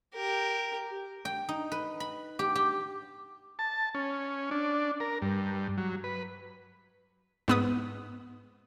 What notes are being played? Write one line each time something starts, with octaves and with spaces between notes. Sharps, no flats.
G4 A#4
G5
D#4
B4
B5
G4
G4
A5
C#4
D4
A#4
G2
F#3
B4
G#2 B3 D#6